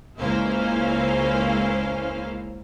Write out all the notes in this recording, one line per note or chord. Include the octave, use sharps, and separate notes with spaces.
C#2 A#3 C#4 E4 C5 F5